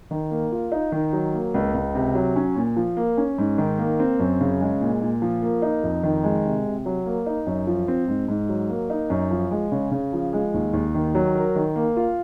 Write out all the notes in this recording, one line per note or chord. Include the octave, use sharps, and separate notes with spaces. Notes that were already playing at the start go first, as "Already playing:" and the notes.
D#3
A#3
F4
D#4
D#3
F#3
A#3
C#2
C#2
C3
F#3
C#4
A#2
F3
A#3
C#4
G#2
D#3
A#3
C4
F#2
C#3
G#3
A#2
A#2
F3
A#3
D#4
F2
D#3
G#3
C3
C3
F#3
A#3
D#4
F#2
F3
C4
G#2
G#2
F#3
A#3
D#4
F#2
F3
G#3
C#3
C#3
F3
G#3
D#2
D#2
D#3
F#3
A#4
D#3
A#3
F4